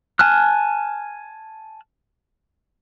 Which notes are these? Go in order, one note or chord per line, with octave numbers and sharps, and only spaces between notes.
G#5 A5 F6 F#6